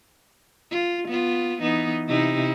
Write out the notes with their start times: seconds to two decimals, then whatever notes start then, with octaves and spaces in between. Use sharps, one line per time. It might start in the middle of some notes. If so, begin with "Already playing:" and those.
0.71 F4
1.08 B3 F4
1.61 E3 B3 D#4
2.07 C3 D#4 E4